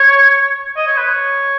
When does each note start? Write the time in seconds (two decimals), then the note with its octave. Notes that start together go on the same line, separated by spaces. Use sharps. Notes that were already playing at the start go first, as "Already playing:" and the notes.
Already playing: C#5
0.76 D#5
0.86 C#5
0.97 B4
1.08 C#5